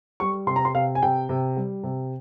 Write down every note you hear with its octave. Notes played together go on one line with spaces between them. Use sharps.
G3 C#6
C3 C6
A#5
C6
C3 F5
G#5
C3 G5
C3
G3
C3